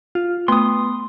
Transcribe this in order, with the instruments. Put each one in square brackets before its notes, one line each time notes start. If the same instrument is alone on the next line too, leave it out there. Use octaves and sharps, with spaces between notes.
[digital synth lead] F4
[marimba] A3 [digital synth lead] B3 [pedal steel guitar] C6 D#6